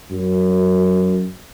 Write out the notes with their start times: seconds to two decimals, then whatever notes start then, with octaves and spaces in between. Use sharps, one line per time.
0.11 F#2